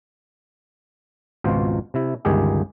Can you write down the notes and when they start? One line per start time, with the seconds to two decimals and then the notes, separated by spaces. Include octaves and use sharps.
1.44 G#1 C#2 B2 F4 C5
1.94 C3 E4
2.25 G1 C#2 D#3 G4 G#4